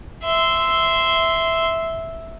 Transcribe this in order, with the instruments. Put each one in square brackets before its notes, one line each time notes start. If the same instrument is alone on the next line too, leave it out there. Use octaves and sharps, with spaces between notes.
[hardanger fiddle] E5 C6